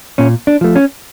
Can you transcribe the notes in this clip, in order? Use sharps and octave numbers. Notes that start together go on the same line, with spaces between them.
A#2 C#4
D4
F3 A3
C#4